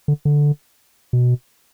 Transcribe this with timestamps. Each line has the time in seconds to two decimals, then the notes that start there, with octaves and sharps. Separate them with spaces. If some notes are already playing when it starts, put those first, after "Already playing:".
0.08 D3
0.25 D3
1.13 B2